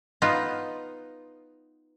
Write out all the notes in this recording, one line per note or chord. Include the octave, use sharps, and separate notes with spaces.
B3 D#4 F4